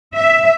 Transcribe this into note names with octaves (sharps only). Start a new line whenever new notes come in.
E5